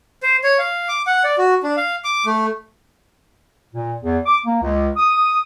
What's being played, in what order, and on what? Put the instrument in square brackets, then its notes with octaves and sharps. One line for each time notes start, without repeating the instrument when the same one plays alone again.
[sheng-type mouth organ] C5
C#5
F5
D6
F#5
D5
F#4
D4
F5
D6
A3
[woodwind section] A#2
E2
D6
A#3
C#2
D#6